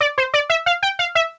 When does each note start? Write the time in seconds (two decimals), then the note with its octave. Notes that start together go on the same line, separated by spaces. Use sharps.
0.01 D5
0.18 C5
0.34 D5
0.50 E5
0.66 F5
0.83 G5
0.99 F5
1.15 E5